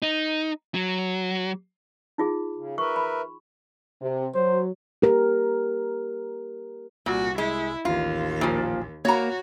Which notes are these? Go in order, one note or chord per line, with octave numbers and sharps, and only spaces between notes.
D#4
F#3
D#4 F4 G#4
C#3
A#4 B4 E5 C#6
B5
C3
F#3 C5
G4 A#4
C2 A#2 F#4
G#3 E4
A1 D#2 F4
A#2 F3
A#3 F#4 C#5 A#5